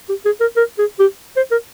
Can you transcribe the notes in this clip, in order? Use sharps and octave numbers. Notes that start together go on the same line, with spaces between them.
G4
G#4
A#4
A#4
G#4
G4
C5
A#4